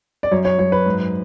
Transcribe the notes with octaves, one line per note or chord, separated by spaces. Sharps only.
D5
F#2 C#5
C#5
F#2 C#5
B4
G#2